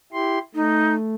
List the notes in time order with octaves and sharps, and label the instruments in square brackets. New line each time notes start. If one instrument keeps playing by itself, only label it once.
[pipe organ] E4 G4 C6
[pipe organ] A3 [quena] D#4